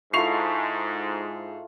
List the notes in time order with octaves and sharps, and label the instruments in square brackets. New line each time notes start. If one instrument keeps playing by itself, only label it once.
[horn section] G#2 [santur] E4 F4 A4 [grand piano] C#6 C7 F7